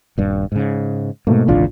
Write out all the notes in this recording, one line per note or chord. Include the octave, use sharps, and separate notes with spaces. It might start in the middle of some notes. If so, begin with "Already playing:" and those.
D#1 G2
G#2 C#3
G#2 B2 A3 A#3
G#1 C#2 A#2 E3 D4 F4